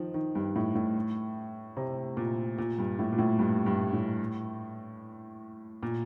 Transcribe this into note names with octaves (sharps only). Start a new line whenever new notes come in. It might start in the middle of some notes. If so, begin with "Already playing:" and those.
Already playing: D#3 F3
D#3
G2
A2
A2
C3
A#2
A#2
G2
A2
A#2
A2
G2
G2
A2
A#2